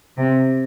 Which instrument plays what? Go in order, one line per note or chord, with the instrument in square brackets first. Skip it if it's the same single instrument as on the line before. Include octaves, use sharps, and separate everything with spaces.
[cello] C3